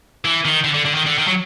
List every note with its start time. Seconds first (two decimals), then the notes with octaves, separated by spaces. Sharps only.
0.25 E3
0.45 D#3
0.64 D3
0.74 D3
0.85 D3
0.95 D#3
1.06 D3
1.18 D#3
1.28 F#3